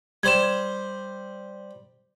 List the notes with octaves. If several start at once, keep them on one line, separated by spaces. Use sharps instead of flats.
G3 C5 G#6 E7